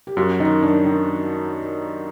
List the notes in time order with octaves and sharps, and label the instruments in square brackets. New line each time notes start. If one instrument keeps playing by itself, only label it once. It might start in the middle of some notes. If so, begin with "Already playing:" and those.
[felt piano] G4
[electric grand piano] F#2 [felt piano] F#4
[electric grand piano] D#3 [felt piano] D#4
[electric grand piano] F#2 [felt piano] D4
[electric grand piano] D#3